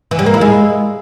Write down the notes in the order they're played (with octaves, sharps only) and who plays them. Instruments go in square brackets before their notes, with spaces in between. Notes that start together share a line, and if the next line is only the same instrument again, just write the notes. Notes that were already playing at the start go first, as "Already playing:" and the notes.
[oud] E3
G3
A#3
E4
G#3